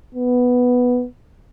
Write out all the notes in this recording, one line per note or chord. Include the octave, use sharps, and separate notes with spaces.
B3